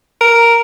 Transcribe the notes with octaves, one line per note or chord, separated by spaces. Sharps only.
A#4